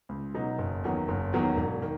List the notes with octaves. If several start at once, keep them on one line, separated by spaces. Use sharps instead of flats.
C#2
B2 F#3 B3 D#4
F#1
E2 D#3 F#3 B3
F#1
E2 D#3 F#3 B3
E1
D#3